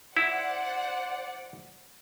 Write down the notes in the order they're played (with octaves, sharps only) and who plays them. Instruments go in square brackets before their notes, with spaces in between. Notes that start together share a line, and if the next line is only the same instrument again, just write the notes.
[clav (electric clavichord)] E4 [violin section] C5 D5 F#5